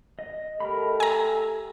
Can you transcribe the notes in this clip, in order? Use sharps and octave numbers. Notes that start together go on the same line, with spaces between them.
D#5
A3 G4 A4 A#4 D#5 B5
G#5 A#5 E6